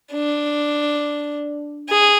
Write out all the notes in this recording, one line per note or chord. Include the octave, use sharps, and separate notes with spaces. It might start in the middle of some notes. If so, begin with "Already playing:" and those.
D4
G#4